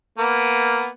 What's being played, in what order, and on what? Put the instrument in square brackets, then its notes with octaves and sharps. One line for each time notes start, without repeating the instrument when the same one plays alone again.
[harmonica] A#3 B3